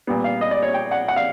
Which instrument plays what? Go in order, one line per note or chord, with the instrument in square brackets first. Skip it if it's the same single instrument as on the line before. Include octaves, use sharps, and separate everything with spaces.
[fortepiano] A#2 G3 B3
F5
D#5
D5
C#5
G5
F#5
F#5
F5